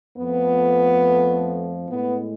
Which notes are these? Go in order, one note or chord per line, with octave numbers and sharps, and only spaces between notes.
F2 F3 A3 B3
A2 G#3 B3